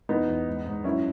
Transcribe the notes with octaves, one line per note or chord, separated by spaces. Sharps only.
E2 B3 D#4
E2
G#2
G#2
F#2 C#4 E4